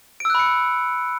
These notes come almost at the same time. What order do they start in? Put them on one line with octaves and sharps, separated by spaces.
D7 E6 F#6 B5 C#7